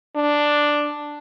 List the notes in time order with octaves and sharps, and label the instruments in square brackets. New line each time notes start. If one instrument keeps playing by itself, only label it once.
[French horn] D4